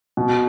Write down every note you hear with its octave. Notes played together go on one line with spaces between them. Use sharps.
B2